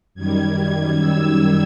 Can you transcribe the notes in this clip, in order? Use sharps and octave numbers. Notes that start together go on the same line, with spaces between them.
F#2 D#3 G3 G#6
E6